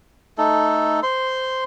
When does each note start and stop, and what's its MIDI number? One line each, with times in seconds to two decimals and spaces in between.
0.38 1.00 57
0.38 1.00 63
0.38 1.00 69
1.03 1.64 72
1.03 1.64 84